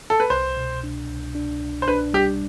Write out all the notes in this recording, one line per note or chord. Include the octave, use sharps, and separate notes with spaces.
A4
B4
C2 C5
B2
D4
C2
D4
C2
C5
D4 B4
G3 G4